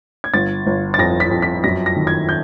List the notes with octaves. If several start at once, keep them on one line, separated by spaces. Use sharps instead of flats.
G#6
G1 A6
G1
A6
F2 A#6
B6
F2
B6
F#2 A#6
A#6
D#3
G#6
G6